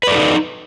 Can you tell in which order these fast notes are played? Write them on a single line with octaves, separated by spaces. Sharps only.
B4 D5 A4 D#4